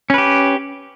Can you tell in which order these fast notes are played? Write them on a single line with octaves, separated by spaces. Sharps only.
C#4 B4 G4